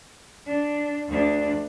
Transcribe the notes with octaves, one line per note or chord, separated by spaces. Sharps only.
D4
D2 D4